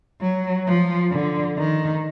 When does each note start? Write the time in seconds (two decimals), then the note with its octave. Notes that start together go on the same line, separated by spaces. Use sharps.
0.21 F#3
0.67 F3
1.12 D3
1.58 D#3